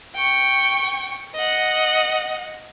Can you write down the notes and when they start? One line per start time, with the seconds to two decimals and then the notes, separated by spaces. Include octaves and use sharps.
0.16 G5 C#6
1.35 D#5 F#5